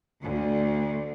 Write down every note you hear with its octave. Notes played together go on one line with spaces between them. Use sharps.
D2